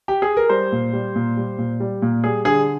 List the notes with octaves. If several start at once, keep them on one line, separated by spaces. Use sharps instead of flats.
G4
G#4
A#4
G3 C5
A#2
G3
A#2
G3
A#2
G3
A#2
G3 G#4
D3 G#4